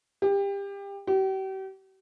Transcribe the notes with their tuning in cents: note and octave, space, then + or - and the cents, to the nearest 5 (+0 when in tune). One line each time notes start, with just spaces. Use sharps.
G4 +25
G4 -40